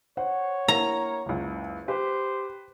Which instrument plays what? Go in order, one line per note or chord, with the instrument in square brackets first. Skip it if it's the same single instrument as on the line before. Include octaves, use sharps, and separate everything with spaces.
[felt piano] C5 [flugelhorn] C#5 [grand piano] F#5
[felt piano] A#3 E4 [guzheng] A#5
[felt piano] F#1 C#2
[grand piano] G4 [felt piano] B4 [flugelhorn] C5